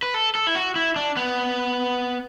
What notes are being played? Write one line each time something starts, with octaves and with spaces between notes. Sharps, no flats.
B4
A4
A4
E4
F#4
E4
D4
B3